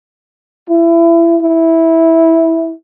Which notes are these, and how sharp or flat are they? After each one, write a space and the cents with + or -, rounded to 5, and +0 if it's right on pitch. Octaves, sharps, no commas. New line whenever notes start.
E4 +25
E4 -10